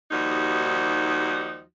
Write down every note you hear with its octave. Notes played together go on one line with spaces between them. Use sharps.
D#2 F3 G3 D#4 F#4